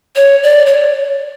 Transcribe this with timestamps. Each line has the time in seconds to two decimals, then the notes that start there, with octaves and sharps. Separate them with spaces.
0.16 C#5
0.43 D5
0.66 C#5